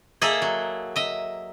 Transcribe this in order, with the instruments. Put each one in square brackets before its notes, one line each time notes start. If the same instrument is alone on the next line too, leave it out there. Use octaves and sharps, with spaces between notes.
[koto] A#3 G#4 A4 D#5 E5
F#3
D#5 E5